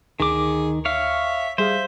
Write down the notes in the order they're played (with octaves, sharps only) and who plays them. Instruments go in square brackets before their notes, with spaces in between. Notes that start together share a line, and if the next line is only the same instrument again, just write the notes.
[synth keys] D2 [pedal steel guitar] D#3 D6 [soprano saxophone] G#4
[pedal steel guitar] C#5 F5 [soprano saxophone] E5
[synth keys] G3 G#4 F5 [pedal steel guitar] C5 [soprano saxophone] E5